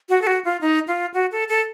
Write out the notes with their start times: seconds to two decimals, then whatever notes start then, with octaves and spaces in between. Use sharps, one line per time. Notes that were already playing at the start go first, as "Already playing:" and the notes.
0.09 F#4
0.22 A4
0.27 F#4
0.45 F4
0.61 D#4
0.88 F4
1.14 F#4
1.32 A4
1.49 A4